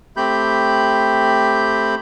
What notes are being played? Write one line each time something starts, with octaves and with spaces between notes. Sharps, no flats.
A3 C4 G4 B5 G6